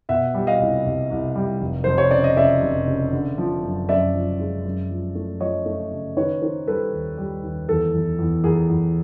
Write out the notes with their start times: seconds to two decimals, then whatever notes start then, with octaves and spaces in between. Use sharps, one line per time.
0.09 B2 E5 F#5
0.34 G3
0.47 D#5 F5
0.60 C2
0.85 C2
1.11 C2
1.36 G3
1.61 F1
1.84 F1 C5
1.98 C#5
2.11 C#3 D5
2.24 D#5
2.37 C#3 D5 E5
2.62 F1
2.88 C#3
3.13 D3
3.38 F3
3.63 F#2
3.89 F#2 D5 E5
4.14 F3
4.40 G#3
4.65 F#2
4.90 F3
5.15 A3
5.40 F3 C#5 D#5
5.66 A3
5.91 C#3
6.17 D#3 B4 C#5
6.42 D#3 A#4 C5
6.67 G3 A4 B4
6.93 D#2
7.18 G3
7.43 D#2
7.69 E2 A4
7.94 E2
8.19 E2
8.44 E2 G#4 A#4
8.70 E2